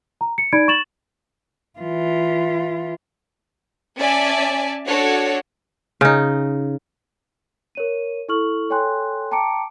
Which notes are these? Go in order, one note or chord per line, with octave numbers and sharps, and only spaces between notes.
A#5
C#7
D#4 D5 B5 G#6 D7
C#6 A6 E7 F#7
E3 F4
C#4 D5 E5 G#5 A5
D4 F#4 A4 C#5
C#3 D#4
A#4 C#5 D#7
E4 A4 C#6 F6 F#7
A4 C#5 G5 G#5 C6 F#6
G5 A5 A#5 D6 C#7 D7